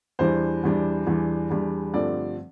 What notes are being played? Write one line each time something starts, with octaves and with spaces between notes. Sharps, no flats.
E2 E3 G3 D4 C5
E2 E3 G3 D4
E2 E3 G3 D4
E2 E3 G3 D4
G2 D3 F3 A3 C4 D5